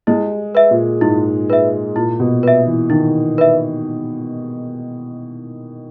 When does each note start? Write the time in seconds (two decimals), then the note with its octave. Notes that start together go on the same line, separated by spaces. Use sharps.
0.07 G#3 E4
0.55 B4 E5
0.71 A#2
1.01 G#2 E4
1.50 B4 E5
1.96 A#2 E4
2.20 B2
2.43 B4 E5
2.67 E3
2.90 D#3 E4
3.38 B4 E5